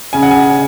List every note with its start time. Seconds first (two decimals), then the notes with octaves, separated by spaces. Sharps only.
0.13 C#3 G#5
0.23 F#5
0.31 G#5